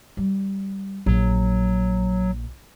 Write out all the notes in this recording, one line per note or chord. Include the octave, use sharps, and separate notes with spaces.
G3
A#1 F#3